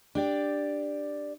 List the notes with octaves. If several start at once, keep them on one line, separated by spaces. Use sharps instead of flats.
D4 G4 D5